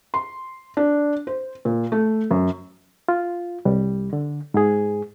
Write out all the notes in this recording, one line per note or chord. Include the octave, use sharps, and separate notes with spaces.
C6
D4
C5
A#2
A3
F#2
F4
C2 G3
D3
G#2 G#4